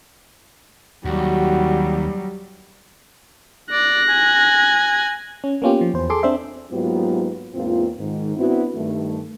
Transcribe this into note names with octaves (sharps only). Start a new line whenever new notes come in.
D#2 F#3 G3 F#4
D5 F#6 A#6
G#5
C#4
A#3 B3 C#4 F4 G4
F3
E2 C5
G#4 A4 C6 D6
C4 D4 C5 E5
G#2 F#3 A#3 B3 F4 G4
E2 G#2 A#3 C4 F4
G#2 D#3
B3 C4 D4 E4 F#4
G2 D#3 G3 A3